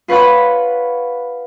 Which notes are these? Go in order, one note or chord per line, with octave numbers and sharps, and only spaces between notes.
F4 B4 C#5 F#5 B5